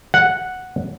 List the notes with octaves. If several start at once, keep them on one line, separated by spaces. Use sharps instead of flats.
F#5